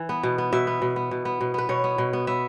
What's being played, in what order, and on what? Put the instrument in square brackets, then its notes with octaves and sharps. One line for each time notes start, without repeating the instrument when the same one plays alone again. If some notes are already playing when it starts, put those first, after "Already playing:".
Already playing: [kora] E3
B3
B2
B3
B2 E5
B3
B2
B3
B2
B3
B2
B3 B4
B2 C#5
B3
B2
B3
B3 E5